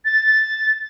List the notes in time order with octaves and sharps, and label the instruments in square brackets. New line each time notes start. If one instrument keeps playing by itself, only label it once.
[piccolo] A6